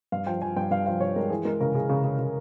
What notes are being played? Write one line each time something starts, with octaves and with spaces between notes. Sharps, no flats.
G2 F5
F3 G5
F3 G#5
G2 G5
G2 F5
F3 F5
G2 C#5
G#3 A#4
E3 G#4
G#3 A#4
C#3 A#4
C#3 G#4
C#3
C#3
C#3